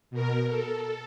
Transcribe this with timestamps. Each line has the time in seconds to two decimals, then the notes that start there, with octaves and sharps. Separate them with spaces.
0.11 B2 A#4
0.49 A4